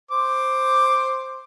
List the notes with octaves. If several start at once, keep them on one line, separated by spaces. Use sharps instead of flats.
C5 D6